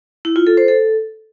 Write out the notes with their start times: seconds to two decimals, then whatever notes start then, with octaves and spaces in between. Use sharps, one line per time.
0.25 E4
0.36 F4
0.47 A4
0.57 C5
0.68 A4